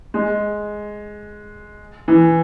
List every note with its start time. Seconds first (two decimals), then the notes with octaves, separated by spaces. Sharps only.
0.14 G#3
2.08 E3